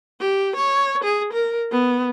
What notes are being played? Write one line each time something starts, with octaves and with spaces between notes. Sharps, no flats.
G4
C#5
G#4
A#4
B3